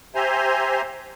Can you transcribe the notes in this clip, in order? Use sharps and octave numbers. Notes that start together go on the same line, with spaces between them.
G4 C5 E5 G#5 A#5 C6